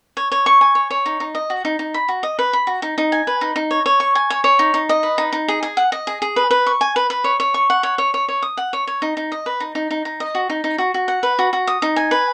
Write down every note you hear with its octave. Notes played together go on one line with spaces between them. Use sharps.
C#5
C#5
C#6
G#5
C#5
C#5
D#4
D#4
D#5
F#4
D#4
D#4
B5
F#4
D#5
B4
B5
F#4
D#4
D#4
G#5
B4
D#4
D#4
C#5
C#5
C#6
G#5
C#5
C#5
D#4
D#4
D#5
B4
D#4
D#4
G#4
G#4
F#5
D#5
G#4
G#4
B4
B4
C#6
G#5
B4
B4
C#5
C#5
C#6
F#5
C#5
C#5
C#5
C#5
D#6
F#5
C#5
C#5
D#4
D#4
D#5
B4
D#4
D#4
D#4
D#4
D#5
F#4
D#4
D#4
F#4
F#4
F#5
B4
F#4
F#4
D#6
D#4
G#5
B4